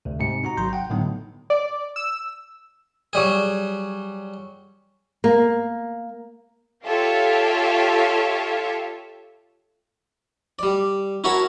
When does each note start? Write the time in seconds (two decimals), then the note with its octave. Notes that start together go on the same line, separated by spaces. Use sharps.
0.05 D2 C3
0.19 G#2 C3 C4 C#7
0.44 D#4 F#4 A#5
0.57 G#1 F#3 A#5 C6 G6
0.73 F#5 G5
0.90 A2 D3 F#3 B3 D#4
1.50 D5
1.96 E6
3.13 F#3 G3 G#4
5.24 A#3
6.86 F4 G4 A4 C#5 E5 F5
10.59 G3 D5
11.24 E4 F#4 A#4 C#5 A5 B5